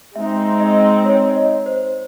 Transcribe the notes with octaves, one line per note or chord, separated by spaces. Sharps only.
G#3 C4 D#4 E5
D#5
C#5
D#5
C#5
C5